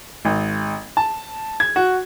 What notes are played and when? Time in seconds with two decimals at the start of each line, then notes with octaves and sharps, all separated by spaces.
0.25 G#1
0.97 A5
1.60 G#6
1.76 F#4